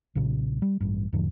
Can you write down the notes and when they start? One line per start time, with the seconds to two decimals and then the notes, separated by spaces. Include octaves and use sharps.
0.15 B1 A#2 C#3
0.62 G3
0.81 A1 G2
1.13 E2 G#2 D3 F3